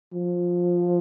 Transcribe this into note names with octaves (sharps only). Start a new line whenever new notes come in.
F3